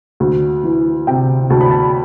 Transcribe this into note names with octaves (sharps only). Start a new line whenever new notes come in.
D2
E3
C3 G5
D2 A5
B5
A5